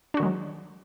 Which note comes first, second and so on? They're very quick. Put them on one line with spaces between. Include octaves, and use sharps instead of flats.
D4 F#4 D#3 G#3 F#3